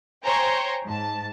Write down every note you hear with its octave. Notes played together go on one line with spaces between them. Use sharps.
C5 C#5 G5 G#5 A#5 C6
G#2 A5